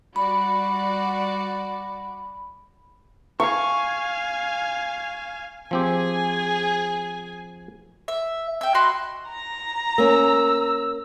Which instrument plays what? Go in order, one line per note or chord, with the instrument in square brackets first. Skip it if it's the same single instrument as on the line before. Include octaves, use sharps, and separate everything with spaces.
[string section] G3 F#4 D5 [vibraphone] B5
[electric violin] F5 G#5 [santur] C#6
[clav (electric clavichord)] F3 C4 G4 [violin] G#4 G#5
[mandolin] E5
E5 G5
F#4 D#5 B5 C6
[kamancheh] A#5
[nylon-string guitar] A#3 C#4 [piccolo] E6